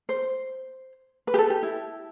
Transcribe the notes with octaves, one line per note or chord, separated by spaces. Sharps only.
C5
B4
G4
A4
G4
E4